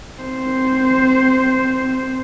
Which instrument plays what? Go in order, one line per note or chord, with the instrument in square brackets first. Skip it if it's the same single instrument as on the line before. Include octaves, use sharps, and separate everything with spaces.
[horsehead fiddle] C4 C5